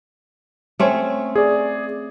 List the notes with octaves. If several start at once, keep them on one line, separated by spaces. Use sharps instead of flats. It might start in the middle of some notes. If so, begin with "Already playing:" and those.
A3 C4 C#4
G#4 D5